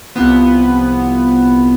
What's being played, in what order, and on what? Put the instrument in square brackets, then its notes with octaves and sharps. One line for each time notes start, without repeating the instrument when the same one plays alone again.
[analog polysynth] C2 C3 F3 B3